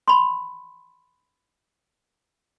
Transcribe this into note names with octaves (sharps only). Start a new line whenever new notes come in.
B5 C6